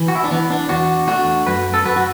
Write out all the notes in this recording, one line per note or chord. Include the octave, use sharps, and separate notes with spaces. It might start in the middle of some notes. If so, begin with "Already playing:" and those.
Already playing: E3
F#4
E4
D4
E3 B3
D4
E2 D4 F#4
A3 D4 F#4
F#2 F#4 B4
A4
F#2 F#4 B4
F#4